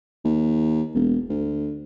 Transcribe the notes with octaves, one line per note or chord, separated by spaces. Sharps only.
D#2
E1
D2